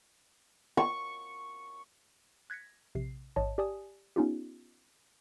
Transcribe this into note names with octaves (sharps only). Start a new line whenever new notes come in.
C#6
F#6 G#6 A#6 B6 C#7
A#1 C3 C7
A1 G#2 C#5 D#5 A5
G4 D5 G#5 A5 D#6
B3 C#4 D#4 F4 G4